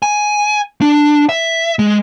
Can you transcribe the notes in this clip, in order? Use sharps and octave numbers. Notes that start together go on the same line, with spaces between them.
G#5
D4
E5
G#3